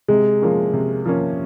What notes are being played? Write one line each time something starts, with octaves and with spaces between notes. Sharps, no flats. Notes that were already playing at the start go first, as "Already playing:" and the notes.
C3 G#3
F3 A#3 C#4
C3
F3 A#3 C#4